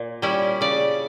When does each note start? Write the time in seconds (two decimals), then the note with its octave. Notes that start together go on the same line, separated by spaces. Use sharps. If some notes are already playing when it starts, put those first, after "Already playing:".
Already playing: A#2
0.22 G3 C#4 E4
0.61 C#3 D5